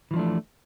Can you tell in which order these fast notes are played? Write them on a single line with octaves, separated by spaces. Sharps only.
E3 F3 D4 A3